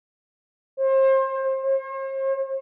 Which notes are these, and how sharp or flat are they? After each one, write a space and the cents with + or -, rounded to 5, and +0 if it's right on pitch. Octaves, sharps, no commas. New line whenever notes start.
C5 +30
C5 +45